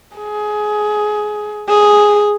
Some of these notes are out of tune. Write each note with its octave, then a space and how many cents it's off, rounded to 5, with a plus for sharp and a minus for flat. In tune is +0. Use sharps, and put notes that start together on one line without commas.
G#4 +20
G#4 +0